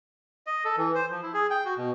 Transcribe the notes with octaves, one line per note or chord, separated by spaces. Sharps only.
D#5
A4
E3
C5
F3
E4
G#4
G5
F#4
B2